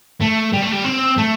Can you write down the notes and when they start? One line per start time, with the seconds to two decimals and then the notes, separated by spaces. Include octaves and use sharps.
0.20 A3
0.53 G3
0.62 A3
0.72 G3
0.85 C4
1.18 A3